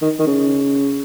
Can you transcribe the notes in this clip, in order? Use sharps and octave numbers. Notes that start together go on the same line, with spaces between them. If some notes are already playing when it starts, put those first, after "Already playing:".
D#3
D#3
C#3